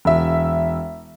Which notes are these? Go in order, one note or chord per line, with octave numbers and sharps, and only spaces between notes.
E1 E5